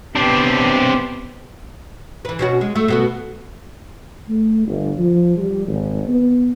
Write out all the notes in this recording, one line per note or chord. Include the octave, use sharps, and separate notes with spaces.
B3 C4 D4 G4
E3 B4
B2 C#4 F#4
G#3
A3
B2 B3 F#4
A3
G1
F3
G3
G#1
B3